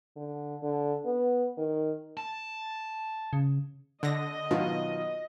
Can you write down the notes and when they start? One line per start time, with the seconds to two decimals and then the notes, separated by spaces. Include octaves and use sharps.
0.17 D3
0.63 D3
1.06 B3
1.58 D#3
2.17 A5
3.33 C#3
4.03 D3 D#5 A#6
4.51 B2 D#3 F#3 F4